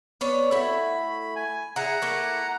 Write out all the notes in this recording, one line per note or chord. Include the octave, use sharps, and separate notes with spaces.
B3 D4 C#5
A3 E4 F#4 B5
G#5
E4 G#4 F#5 A#5
A3 A#3 E4